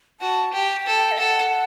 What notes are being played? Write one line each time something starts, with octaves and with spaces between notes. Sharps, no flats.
F#4 A5
G4 G5
A4
D#5
A4 F#5